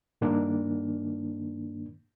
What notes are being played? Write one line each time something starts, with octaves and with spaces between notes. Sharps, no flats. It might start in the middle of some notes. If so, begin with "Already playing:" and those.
G2 D#3 A#3 D4